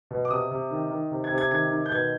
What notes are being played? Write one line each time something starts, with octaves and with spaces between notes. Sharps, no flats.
B2
D6
C3 D#6
C3
D#3
D#3
C3
G#6
C3
G#6
D#3 G#6
D#3
G6
B2 G#6